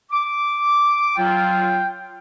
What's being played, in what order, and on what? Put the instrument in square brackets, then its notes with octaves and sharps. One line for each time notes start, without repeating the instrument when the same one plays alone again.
[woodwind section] D6
[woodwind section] F#3 F4 [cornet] G5